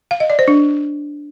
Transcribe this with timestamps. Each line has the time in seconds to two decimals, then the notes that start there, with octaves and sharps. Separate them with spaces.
0.11 F5
0.20 D#5
0.30 D5
0.39 C5
0.48 D4